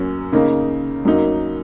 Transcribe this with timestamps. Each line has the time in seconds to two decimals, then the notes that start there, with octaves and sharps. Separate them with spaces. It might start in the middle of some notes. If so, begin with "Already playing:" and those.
Already playing: F#2 F#3 A#3 C#4
0.32 C#3 A#3 D#4
1.05 F#2 F#3 A#3 D#4